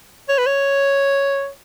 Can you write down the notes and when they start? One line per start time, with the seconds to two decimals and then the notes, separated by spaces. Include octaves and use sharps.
0.29 C#5
0.38 B4
0.46 C#5